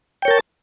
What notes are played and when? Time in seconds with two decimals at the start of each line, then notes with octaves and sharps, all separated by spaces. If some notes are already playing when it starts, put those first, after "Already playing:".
0.22 G5
0.25 C#5
0.28 A#4
0.31 A5